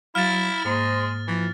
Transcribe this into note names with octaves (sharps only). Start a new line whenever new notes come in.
F#3 E4 F5 F6 A6
G#2 G#3 A#3 C5
E3 F3